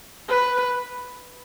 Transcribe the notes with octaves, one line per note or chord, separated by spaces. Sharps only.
B4